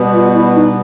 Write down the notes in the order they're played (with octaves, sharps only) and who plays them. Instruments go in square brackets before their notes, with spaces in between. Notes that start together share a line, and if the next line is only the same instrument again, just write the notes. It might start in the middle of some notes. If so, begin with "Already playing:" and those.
Already playing: [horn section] B2 G3 B3
[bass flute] F4
E4
D#4